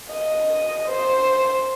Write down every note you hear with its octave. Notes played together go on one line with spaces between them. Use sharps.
D#5
C5